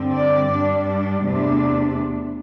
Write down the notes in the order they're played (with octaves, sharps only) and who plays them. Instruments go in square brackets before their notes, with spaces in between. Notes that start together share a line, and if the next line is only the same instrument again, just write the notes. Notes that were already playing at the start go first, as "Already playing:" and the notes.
Already playing: [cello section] G2 D3 C4
D5
G2 G3 D4
E2 C3 A3 D4